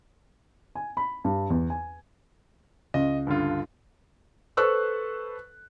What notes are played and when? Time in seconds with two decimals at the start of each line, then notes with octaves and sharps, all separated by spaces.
0.75 G#5
0.97 B5
1.24 G2
1.50 E2
1.70 G#5
2.94 C#2 D#5
3.27 G2 D3 F4
4.57 A4 B4 C5 C#6 E6 F#6